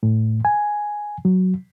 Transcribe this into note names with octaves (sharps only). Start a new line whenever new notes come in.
A2
G#5
F#3